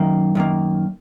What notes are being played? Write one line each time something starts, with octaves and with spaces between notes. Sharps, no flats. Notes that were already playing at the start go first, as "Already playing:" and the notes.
Already playing: F#2 D#3 A#3
F#2 D#3 A#3